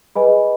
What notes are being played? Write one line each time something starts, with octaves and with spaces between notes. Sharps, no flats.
G#4 B4 D#5 G#5 B5